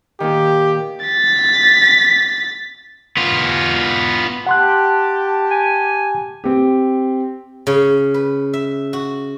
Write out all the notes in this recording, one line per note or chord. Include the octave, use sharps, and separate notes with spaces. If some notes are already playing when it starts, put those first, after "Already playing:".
A#2 D#3 G4
A6 B6
B3 F4
G4 F#5 A5 C6 F#6
G#5
C4 G4
C#3
B4
E5
F#4